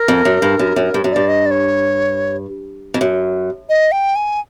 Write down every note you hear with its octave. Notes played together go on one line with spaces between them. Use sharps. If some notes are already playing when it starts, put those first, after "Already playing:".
Already playing: A#4
F2
F#2
G2
F#2
F#2
G2
F#2
G2 D5
D#5
D5
C#5
F2
F#2
D#5
G5
G#5